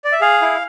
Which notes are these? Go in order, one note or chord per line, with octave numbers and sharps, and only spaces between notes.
D5
E5
G#4 F5
E4